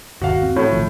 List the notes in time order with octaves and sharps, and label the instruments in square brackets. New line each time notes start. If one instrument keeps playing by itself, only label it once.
[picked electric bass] G1 D#2 [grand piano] F#4 F5
[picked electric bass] C4
[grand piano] A2
[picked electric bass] A#1 D#3 F3